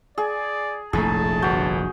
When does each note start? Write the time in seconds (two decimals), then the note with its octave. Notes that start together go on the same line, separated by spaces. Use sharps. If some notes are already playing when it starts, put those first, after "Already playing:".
0.18 G#4 D5
0.93 F1 A#1 A2 A3 G#4 A5 A#5
1.42 G1 F#4 G6